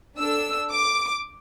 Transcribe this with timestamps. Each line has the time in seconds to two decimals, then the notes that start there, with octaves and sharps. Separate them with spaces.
0.17 D4 A4 E6
0.71 D6